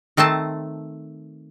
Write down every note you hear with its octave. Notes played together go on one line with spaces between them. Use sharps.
D#3 A3 C4 C5 A5